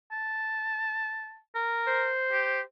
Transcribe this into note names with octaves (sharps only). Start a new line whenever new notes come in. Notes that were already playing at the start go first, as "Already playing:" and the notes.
A5
A#4
C5
G4